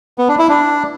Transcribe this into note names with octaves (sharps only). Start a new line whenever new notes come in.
B3
D4
E4
D4